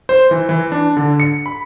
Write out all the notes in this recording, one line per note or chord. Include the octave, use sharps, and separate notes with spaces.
C5
E3
E3
D4
D3
C#7
B5